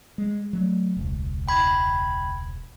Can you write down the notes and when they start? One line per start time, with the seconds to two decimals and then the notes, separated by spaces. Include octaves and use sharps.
0.18 G#3
0.53 F#3 A3
0.97 E1 C#2
1.47 G5 B5 G#6